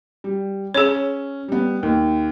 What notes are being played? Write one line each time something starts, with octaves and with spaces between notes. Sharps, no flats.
G3
C#4 G#4 C#5
G3 B3
D#2